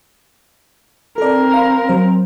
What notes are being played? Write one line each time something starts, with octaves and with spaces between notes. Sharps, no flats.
C4 A4 A#4 D5
F5 B5
F#3 C5